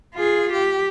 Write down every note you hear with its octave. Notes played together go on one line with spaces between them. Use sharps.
F4 G#4
G4